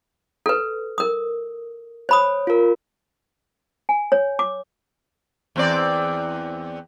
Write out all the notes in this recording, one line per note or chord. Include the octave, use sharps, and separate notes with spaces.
A4 B4
A#4 D#6
C5 C#5 B5 D#6
F4 A#4
G#5
C#5
D6
E2 C4 D5